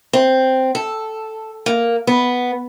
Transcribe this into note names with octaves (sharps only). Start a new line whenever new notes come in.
C4
A4
A#3
B3